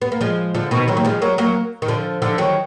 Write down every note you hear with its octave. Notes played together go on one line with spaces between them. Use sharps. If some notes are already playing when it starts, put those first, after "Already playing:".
B3
A#3
F3 G#3
D3 F3
B2 D#3
D#3 F#3
A#3
F3 G#3
F#3 A#3
F#3 A#3
D#3
D3 F3
D3 F3
D#3 F#3